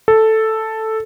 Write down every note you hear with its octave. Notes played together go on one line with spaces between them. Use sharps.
A4